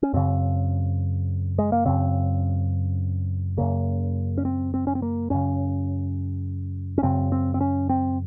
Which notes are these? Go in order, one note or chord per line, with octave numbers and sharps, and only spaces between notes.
C#4
F#2 C#3 C4
G#3
A#3
F#2 C#3 C4
F#2 C#3 A#3
C#4
C4
C4
C#4
C4
A#3
F#2 C#3 C#4
C#4
F#2 C#3 C4
C4
C4
C#4
C4